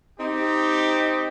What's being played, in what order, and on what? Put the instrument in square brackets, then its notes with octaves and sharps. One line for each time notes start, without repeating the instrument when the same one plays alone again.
[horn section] C4 D#4 G4